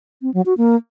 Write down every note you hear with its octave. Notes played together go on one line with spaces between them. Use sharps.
C4
F#3
F#4
A#3